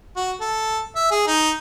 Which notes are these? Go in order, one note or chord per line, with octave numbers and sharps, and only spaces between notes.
F#4
A4
E5
G#4
D#4